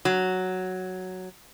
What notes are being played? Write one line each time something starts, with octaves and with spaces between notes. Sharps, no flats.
F#3